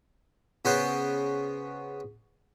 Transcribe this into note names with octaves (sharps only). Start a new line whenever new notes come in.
C#3 B3 F#4 C5